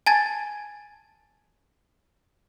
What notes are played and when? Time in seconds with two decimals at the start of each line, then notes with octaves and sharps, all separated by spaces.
0.06 G#5 A5 G#6 A6